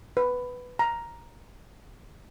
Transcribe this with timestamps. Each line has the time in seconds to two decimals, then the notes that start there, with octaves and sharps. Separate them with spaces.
0.17 B4
0.79 A#5